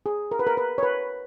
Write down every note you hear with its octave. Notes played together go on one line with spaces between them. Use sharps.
G#4
A#4
B4
A#4
B4
C#5
B4